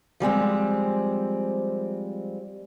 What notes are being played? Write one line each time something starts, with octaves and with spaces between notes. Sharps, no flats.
F3 G3 G#3 C4